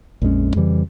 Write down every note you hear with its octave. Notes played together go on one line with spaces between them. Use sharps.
A#1 F2 G#3 C#4
F2 C#3 E3 G3